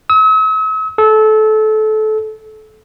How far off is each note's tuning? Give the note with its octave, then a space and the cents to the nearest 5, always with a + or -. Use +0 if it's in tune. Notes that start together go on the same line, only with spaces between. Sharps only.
E6 -45
A4 -25